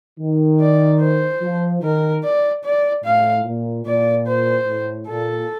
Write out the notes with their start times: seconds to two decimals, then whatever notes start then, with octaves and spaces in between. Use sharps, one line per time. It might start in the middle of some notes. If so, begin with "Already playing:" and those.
0.20 D#3
0.60 D5
1.01 C5
1.42 F3
1.82 D#3 A#4
2.24 D5
2.64 D5
3.04 A2 F5
3.45 A#2
3.86 A#2 D5
4.26 C5
4.67 A2
5.08 A#2 A4